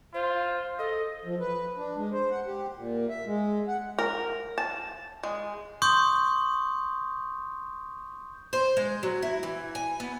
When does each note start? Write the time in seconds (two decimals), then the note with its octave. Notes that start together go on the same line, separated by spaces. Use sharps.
0.14 F4 C5
0.79 A4 D#5
1.25 F3
1.40 B4
1.77 D4
1.96 G#3
2.12 C5
2.31 F#5
2.47 G4
2.77 A#2
3.09 E5
3.26 G#3
3.68 F#5
3.99 A#4
4.58 A5
5.23 G#3
5.82 C6 C#6 D#6 G6
8.53 C5
8.77 G#3
9.03 F#3
9.23 E4
9.43 E3
9.75 G#5
10.00 B3